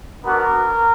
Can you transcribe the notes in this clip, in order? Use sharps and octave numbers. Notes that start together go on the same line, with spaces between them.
B3 D4 F#4 A#4